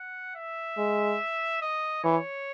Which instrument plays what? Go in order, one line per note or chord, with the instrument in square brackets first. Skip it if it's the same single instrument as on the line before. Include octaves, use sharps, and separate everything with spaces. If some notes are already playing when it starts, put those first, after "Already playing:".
Already playing: [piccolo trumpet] F#5
E5
[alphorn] G#3
[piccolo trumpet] D#5
[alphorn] E3 [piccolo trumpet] C#5